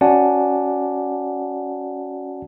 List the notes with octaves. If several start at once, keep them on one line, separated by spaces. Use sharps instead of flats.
C#4 F#4 D5 F#5 G#5 A5